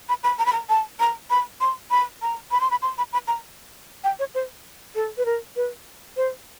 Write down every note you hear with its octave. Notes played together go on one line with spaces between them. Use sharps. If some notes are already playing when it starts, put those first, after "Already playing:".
B5
B5
A#5
B5
A#5
A5
A#5
B5
C6
B5
A#5
B5
C6
B5
C6
B5
B5
A#5
G5
C#5
C5
A4
B4
A#4
B4
C5